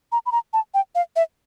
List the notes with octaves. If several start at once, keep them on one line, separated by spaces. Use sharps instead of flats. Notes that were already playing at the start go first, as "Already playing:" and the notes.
A#5
B5
A#5
A5
G5
F5
E5